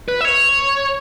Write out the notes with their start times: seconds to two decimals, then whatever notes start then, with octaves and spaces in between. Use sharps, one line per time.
0.08 B4
0.21 E5
0.25 C#5